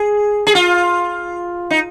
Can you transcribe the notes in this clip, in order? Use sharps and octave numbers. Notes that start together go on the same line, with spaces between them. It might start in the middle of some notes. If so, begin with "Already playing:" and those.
Already playing: G#4
G#4
F4
D#4